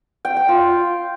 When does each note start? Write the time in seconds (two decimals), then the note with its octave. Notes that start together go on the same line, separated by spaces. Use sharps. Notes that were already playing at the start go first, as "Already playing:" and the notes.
0.25 G5
0.37 G5
0.49 F4